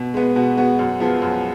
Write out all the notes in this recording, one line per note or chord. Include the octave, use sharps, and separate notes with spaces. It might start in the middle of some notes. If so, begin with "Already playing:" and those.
Already playing: B2
G#3 B3
B2 F#4
G#3 B3 F#4
F#2
F3 G#3 B3
F#2